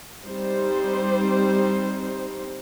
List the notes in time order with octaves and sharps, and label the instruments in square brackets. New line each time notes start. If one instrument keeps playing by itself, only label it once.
[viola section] G3 C4 D#4 C5